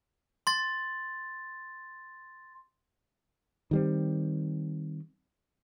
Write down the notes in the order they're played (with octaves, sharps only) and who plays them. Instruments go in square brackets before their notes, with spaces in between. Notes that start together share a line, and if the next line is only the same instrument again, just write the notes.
[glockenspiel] C6 A6
[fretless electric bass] D#3 G3 C4